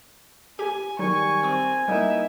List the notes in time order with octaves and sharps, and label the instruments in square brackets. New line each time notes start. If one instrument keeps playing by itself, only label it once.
[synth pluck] G4 [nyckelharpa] G#5
[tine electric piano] D#3 G3 [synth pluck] F#3 [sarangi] G#5 [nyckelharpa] C#6
[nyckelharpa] C4 [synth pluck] G5 C#6 E6
[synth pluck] G3 [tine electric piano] A#3 D#4 [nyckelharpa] E4 E5